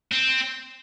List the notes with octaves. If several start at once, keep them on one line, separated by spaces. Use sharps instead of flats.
C4